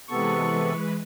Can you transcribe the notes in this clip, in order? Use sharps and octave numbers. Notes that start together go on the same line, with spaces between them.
C3 E3 G#3 B3 A4 B4 C#6